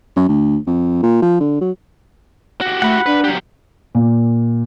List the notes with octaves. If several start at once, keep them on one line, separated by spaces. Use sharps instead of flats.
F#2
D2
F2
A#2
F3
D3
F#3
F#4 G4
A3 F#5 B5
D4 B4
F#3 G4
A#2